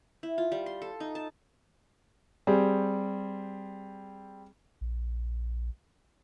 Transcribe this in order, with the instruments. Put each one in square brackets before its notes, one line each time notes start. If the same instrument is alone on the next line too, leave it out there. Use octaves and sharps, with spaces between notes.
[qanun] E4
F4
G3
C6
A4
D#4
A5
[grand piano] G3 C4 G#4
[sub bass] A#1